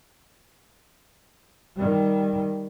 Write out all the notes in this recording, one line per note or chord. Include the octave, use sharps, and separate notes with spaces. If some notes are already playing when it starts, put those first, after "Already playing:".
D#3 G3